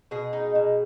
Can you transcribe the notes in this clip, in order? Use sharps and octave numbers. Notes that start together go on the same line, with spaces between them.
B2 G#4
D#4
B2